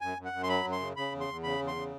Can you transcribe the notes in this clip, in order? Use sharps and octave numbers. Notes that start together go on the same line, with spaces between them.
F#2 G#5
F#2
F#5
F#2
C6
F#3 B5
F#2
C6
C#3
C#3 B5
E2
C6
E2
C#3 B5
E2
C6
C#3